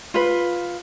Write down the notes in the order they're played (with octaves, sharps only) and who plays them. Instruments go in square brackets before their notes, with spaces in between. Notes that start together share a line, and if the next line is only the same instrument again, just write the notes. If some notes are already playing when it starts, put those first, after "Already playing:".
[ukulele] F4 B4